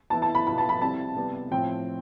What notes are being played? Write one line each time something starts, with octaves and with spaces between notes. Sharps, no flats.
E3 B3 E4 A5
A5
B5
B2 B3 F4 B5
A5
B5
C3 G3 C4 E4 A5
C3 G3 B3
A2 F3 C4 E4 G5